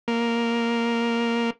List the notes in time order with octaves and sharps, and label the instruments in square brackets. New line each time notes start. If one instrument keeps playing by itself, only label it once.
[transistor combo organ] A#3